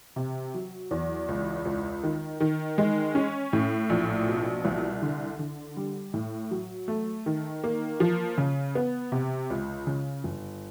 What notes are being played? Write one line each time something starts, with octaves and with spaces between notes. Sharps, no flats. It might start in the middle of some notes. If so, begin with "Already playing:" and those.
C3
F#3
E2
C#2
C#2
D#3
D#3
G#3
C#4
A2
A#1
B2
C2
D3
D3
G3
A2
F#3
A3
D#3
A#3
F3
C#3
B3
C3
C#2
C#3
G1